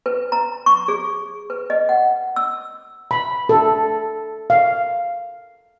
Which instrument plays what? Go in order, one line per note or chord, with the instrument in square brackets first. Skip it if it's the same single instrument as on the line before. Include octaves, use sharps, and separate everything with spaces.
[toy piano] B4
A#5
C#6
G#4
B4
D#5
F#5
E6
[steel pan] B5
A4
F5